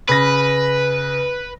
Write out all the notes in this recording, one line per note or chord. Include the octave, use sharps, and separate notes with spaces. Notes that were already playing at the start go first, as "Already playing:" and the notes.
C#3 B4 A#6